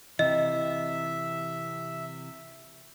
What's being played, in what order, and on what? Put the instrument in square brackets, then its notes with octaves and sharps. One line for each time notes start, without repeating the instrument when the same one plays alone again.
[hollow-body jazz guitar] C3 E3 [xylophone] D#5 [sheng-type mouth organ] E5